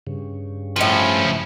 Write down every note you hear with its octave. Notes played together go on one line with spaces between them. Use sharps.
G2 C#3
A2 F3 C#4 B4